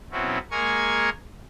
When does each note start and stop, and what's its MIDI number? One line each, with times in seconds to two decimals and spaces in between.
0.11 0.38 47
0.11 0.38 54
0.11 0.38 60
0.11 0.38 61
0.11 0.38 64
0.51 1.09 56
0.51 1.09 58
0.51 1.09 70
0.51 1.09 80
0.51 1.09 85
0.51 1.09 92